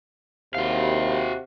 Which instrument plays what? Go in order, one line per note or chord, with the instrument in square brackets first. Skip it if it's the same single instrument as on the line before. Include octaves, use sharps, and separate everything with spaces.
[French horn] D#2 [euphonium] C3 [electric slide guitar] F#4 F5